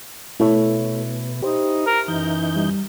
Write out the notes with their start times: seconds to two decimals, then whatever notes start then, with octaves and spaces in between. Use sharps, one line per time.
0.40 B2 A3 E4 A4 C#5
1.42 D#4 G4 C5
1.86 A#4
2.08 F#2 E3 D#4 G6
2.56 G3